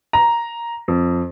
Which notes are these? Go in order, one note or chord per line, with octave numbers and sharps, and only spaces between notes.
A#5
F2